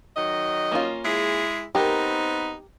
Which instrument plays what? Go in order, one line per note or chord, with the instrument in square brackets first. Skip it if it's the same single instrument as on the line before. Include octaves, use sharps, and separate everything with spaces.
[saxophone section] D#3 F#3 D#5
[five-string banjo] A#3 C#4 F4
[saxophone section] G#3 E4 G#4
[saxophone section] B3 C4 D#4 [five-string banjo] G4 A#4